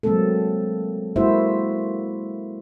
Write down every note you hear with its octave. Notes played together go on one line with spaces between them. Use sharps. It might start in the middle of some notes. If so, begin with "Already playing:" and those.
F#3 G#3 A#3 C4 A4
G#3 A#3 E4 F#4 C5 E5